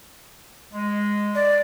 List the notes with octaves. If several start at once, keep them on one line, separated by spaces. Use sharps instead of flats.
G#3
D5